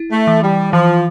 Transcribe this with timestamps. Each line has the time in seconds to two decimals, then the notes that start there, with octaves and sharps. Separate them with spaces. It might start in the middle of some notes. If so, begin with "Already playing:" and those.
Already playing: E4
0.12 A3
0.27 E3
0.42 G3
0.73 E3 F3